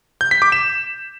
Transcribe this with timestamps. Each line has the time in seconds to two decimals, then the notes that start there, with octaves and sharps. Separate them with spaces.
0.21 G6
0.31 B6
0.42 D6
0.52 E7